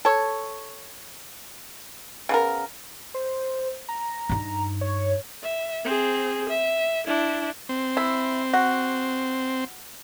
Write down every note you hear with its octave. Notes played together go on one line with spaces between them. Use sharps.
A4 C#5
C#3 B3 A#4
C5
A#5
G2 D#4
C#5
E5
C4 G#4
E5
D4 E4
C4
E4
F#4